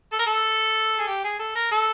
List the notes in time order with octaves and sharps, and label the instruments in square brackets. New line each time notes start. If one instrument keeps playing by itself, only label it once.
[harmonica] A4
A#4
A4
G#4
G4
G#4
A4
A#4
A4